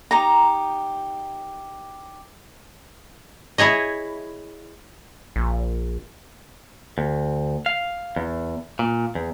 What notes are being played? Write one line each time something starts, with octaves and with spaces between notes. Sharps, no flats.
D#4 G4 A#5
E4 G#4 C#5 D#5
A#1
D2
F5
E2
A#2
E2